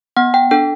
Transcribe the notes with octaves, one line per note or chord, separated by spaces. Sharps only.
B3 F#5
G5
D4 A4 G5